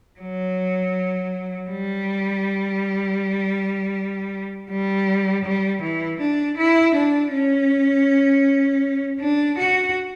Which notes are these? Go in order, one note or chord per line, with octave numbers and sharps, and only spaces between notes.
F#3
G3
G3
G3
E3
D4
E4
D4
C#4
D4
F#4